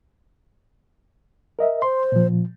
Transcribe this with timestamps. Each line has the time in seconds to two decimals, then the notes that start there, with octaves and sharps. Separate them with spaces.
1.59 A#4 D#5 E5
1.82 C5 C6
2.12 A#2 F3